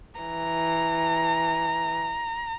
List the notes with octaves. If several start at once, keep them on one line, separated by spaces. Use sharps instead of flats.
E3 A#5